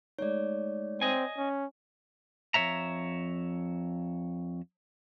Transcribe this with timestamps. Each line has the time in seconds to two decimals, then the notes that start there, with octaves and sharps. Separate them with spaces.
0.19 G#3 A3 D#4 C#5 D5
1.01 C4 D#5 G#5
1.38 C#4
2.54 F2 G#3 C#5 E5 A#5